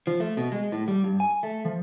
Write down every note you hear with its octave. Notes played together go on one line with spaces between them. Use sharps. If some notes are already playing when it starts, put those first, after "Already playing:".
F3
A3
B2
G#3
A2
G3
G2
G#5
A3
F3